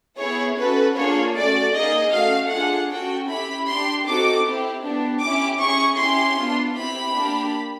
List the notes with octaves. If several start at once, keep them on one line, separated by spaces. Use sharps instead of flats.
B3 E4 G#4 C#5
C#4 F#4 A4 B4
A#3 D4 F4 G#4 C#5
A3 C#4 F#4 D5
A#3 D#4 G#4 D#5
A3 C#4 F#4 F5
D4 F4 G#4 F#5
C#4 F#4 A4 G5
C#4 E4 G4 B5
D4 G4 C6
C4 D#4 F#4 A4 D6
C4 E4 G4
B3 D4 G4
C#4 E4 G4 D6
C#4 E4 G#4 C#6
C#4 E4 G4 C6
B3 D4 F4
C4 E4 G4 B5
A#3 D4 G4